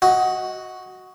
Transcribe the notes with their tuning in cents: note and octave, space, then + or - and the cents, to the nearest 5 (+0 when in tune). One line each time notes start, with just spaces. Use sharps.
F#4 +0 D#5 +20